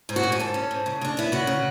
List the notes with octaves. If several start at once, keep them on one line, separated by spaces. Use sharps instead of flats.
G#2
F#4
G#2
G#4
G#2 A4
C#4
G#2
C#3
C#3 D4
B3 E4
C#3 F#4
C#3